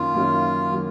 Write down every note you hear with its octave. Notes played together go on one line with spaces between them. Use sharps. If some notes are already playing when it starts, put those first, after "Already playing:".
Already playing: F#2 D#3 F#3 A#3 F4
F#2 D#3 F#3 A#3
D#3 F#3 A#3